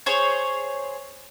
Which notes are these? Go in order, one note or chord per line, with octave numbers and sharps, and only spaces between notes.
G#4 C5 C#5